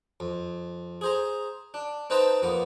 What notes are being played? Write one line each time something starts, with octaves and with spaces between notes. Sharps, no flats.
F2
G#4 C5 A#5
D4
C4 D#4 B4 C5 A5 A#5
F2 A#3 B3